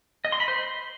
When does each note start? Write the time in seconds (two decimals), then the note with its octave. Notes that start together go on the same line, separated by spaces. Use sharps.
0.25 D#5
0.32 C6
0.40 B5
0.48 C5
0.56 C6